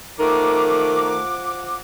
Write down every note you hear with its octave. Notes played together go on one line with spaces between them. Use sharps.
D#3 F3 A3 A#4 F#5 D6